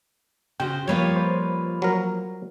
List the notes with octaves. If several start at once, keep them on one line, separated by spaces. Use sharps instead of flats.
C#3 F#4 C5 G5
F3 G3 A#3 F4 B4 C#5
C5
F#3 A#4